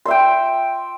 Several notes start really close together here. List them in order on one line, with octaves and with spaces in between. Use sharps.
C6 E5 G5